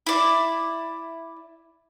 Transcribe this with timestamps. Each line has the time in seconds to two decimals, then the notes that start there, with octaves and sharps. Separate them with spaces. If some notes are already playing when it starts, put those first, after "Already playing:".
0.06 E4 D5